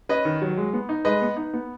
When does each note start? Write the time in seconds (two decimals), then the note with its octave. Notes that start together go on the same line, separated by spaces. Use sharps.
0.09 C#4 B4 D#5
0.25 D#3
0.42 F#3
0.57 G#3
0.73 B3
0.89 D#4
1.05 G#3 B4 D#5
1.22 B3
1.37 D#4
1.54 B3